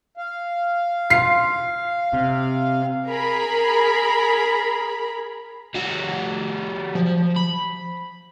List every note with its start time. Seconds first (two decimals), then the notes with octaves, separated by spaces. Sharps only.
0.17 F5
1.10 F4 C7
2.13 C3
3.07 G#4 A#4 A#5 B5
5.74 G3 F#4
6.95 F3
7.36 B5